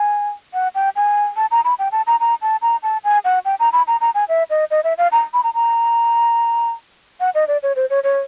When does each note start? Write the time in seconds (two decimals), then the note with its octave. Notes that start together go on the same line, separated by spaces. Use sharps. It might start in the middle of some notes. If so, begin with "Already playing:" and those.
Already playing: G#5
0.54 F#5
0.75 G5
0.96 G#5
1.36 A5
1.51 A#5
1.64 B5
1.79 G5
1.92 A5
2.07 A#5
2.20 A#5
2.42 A5
2.62 A#5
2.83 A5
3.04 G#5
3.24 F#5
3.45 G5
3.59 A#5
3.73 B5
3.87 A#5
4.01 A#5
4.15 G#5
4.29 E5
4.50 D#5
4.71 D#5
4.84 E5
4.98 F5
5.12 A#5
5.33 B5
5.44 A#5
5.54 A#5
7.20 F#5
7.35 D#5
7.48 D5
7.63 C#5
7.76 C5
7.90 C#5
8.04 C#5